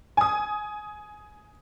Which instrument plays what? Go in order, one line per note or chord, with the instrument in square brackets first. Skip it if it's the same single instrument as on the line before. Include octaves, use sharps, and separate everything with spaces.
[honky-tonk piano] G#5 D#6